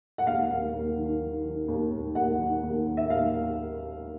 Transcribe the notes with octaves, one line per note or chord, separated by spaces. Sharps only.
F#5
D#2 F5
D#2
D#2
D#3
D#3
D#3
D#2
D#2
D#2 F#5
D#3
D#2
D#3
E5
D#2 F5